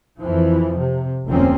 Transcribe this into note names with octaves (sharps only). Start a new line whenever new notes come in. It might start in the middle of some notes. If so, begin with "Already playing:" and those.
F2 E3 F3
C3
F1 D2 F3 A#3 C4 C#4